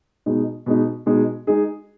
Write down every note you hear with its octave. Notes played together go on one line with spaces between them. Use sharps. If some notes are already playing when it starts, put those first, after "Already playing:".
B2 G#3 D#4
B2 G#3 D#4
B2 G#3 D#4
G#3 D#4 G#4